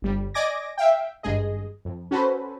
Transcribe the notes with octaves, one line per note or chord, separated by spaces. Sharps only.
G1 G3
D5 D#5 G#5 D6 G#6 A#6
E5 F5 G5
G#1 G2 G#3 G#4 D#5
F2
C#4 F#4 A4 B4 C5